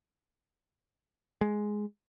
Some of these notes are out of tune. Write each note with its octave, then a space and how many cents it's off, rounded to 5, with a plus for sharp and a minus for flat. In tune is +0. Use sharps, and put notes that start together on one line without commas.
G#3 +5